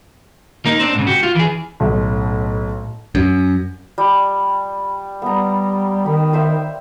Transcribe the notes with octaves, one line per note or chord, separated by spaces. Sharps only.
A#3 D#4
C4 D4
G#2 C#3
F#4 G4
F4
E3 G#4
B1 A2
F#2
G3
G3 B3 A#5
D#3 B5
C5 E5 F5